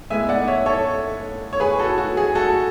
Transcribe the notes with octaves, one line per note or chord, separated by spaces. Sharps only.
A2 G#3 B3 E5 G#5
D5 F#5
C#5 E5
A4 C#5
C#5
G#4 B4
F#4 A4
F#4
G#4
F#4 A4